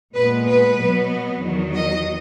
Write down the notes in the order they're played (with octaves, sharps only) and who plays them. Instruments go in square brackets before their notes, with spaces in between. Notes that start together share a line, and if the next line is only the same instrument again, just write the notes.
[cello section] A#2 G#3 B3 B4
B4
B2 F#3 B3
E2 D#3 F#3
D#5